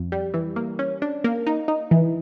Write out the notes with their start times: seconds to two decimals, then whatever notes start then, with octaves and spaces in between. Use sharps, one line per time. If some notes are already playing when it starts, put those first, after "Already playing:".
Already playing: F2
0.12 G3
0.34 E3
0.56 A#3
0.79 C#4
1.02 D4
1.24 A#3
1.47 D#4
1.68 D#4
1.91 E3